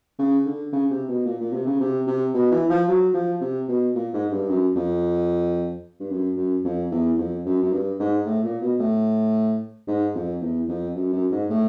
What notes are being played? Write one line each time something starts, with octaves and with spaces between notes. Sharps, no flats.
C#3
D3
C#3
C3
B2
A#2
A#2
C3
C#3
C3
C3
B2
E3
F3
F#3
F3
C3
B2
A#2
G#2
G2
F#2
F2
G2
F#2
F#2
F2
E2
F2
F#2
F#2
G2
G#2
A2
A#2
B2
A2
G#2
F2
E2
F2
F#2
F#2
G#2
A2